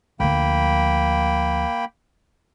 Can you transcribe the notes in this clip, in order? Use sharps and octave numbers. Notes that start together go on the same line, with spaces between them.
D2 F3 A#3 G5 B5